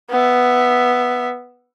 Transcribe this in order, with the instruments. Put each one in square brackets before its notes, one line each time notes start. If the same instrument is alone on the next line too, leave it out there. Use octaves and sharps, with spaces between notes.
[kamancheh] B3 E5